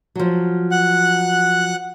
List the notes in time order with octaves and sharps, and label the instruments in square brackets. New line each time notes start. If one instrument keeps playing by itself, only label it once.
[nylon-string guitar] F3 F#3
[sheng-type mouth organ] F#5 F#6